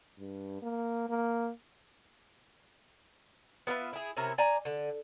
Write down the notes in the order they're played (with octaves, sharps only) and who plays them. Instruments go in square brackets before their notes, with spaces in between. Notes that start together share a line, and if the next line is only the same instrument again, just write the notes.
[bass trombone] G2
A#3
A#3
[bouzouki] B3 F4 B4 E5
E4 G#4
C3 C#4 E4 A#4
D5 G#5 A#5
D3